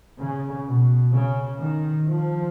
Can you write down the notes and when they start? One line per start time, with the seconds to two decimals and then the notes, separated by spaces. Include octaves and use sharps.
0.20 C#3
0.67 B2
1.14 C#3
1.60 D#3
2.08 F3